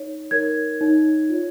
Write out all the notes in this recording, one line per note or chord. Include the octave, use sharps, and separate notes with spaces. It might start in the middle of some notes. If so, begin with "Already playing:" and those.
Already playing: D#4 C#5
D#4 A#4 C#5 G#6
D#4 C#5
F4 C#5